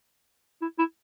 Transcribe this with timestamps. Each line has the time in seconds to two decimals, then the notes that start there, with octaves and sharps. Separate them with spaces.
0.62 E4
0.79 E4